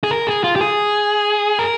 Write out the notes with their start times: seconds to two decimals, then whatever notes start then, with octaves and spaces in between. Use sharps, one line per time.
0.04 G#4
0.11 A#4
0.27 G#4
0.44 F4
0.56 G4
0.61 G#4
1.59 A#4